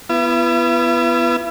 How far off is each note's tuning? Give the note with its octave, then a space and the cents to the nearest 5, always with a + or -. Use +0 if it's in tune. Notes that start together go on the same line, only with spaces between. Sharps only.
B3 +0 E4 +45